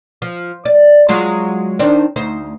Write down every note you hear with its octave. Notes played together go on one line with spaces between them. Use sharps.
F3
D5
F#3 G#3 F4
D#3 C4 D4
D2 D#4 C5